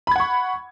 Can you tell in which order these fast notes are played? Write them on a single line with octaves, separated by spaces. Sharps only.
B5 G#6 F#5 C#6